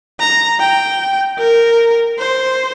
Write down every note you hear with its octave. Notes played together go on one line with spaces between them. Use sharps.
A#5
G5
A#4
C5